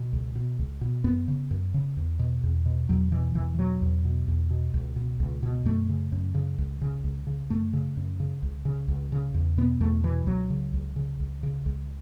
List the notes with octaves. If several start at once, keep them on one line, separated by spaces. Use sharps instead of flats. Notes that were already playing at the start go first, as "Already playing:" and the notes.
Already playing: B2
C#2
B2
C#2
B2
F#2 B3
C#3
F#2
C#3
E2
B2
E2
B2
E2 F#3
B2 E3
E2 E3
B2 F#3
E2
B2
E2
B2
C#2
B2
C#2
B2
F#2 A3
C#3
F#2
C#3
C#2
C#3
C#2
C#3
F#2 A3
C#3
F#2
C#3
C#2
C#3
C#2
C#3
E2
B2 B3
E2 A3
B2 E3
C#2 F#3
C#3
C#2
C#3
C#2
C#3
C#2